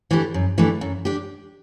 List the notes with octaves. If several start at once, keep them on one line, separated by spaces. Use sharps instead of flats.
E3 A3 D4 G4
F#2
E3 A3 D4 G4
F#2
D4 G4